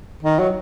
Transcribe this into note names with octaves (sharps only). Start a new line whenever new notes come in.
D#3
F#3